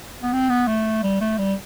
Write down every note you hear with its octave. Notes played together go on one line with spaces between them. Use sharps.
B3
C4
B3
A3
G3
A3
G3